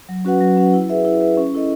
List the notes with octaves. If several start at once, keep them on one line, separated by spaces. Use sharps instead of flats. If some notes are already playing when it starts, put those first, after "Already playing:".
F#3
C#4 F#4 B4 F#5
F#3
C#4 F#4 B4 F#5
E4
G#4 B4 E5
E4
G#4 B4 E5
C#4
E4 A4 D#5